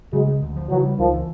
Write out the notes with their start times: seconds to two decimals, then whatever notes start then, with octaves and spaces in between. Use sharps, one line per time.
0.13 C#3 F#3 G#3
0.27 G#3
0.42 D2
0.56 F3
0.70 C#3 E3 F#3
0.85 G3
0.99 C#2 D#3 F3
1.14 E3